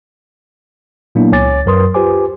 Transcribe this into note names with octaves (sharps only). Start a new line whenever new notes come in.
A#2 F#3 A#3 B3 D4 E4
C#2 C#5 G#5 D6 A6
F#2 F#3 A#4 B4 C6 D#6
F4 G4 B4 C5 G#5 D6